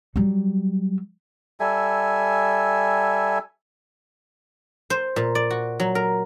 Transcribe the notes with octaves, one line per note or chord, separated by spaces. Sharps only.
F#3 G3
G3 A4 E5 G#5
C5
A#2
D5
F#4
F#3
A#4